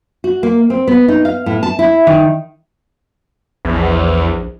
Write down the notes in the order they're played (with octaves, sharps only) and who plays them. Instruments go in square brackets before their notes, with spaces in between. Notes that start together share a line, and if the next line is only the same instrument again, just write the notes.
[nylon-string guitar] F#4
A#3
C4
B3
D#4
F5
A2
A5
E4
D#3
[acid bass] A#1 [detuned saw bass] E2